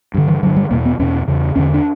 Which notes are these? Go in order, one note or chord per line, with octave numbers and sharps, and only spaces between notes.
G2 D3
E3
G2 D3 F#3
G3
E2 B2 A#3
B3
E2 B2 C#4
E2 C#3
E2 D3 C#4
D4